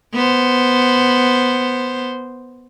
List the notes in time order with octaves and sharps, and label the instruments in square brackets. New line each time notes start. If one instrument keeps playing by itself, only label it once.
[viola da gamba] B3 C5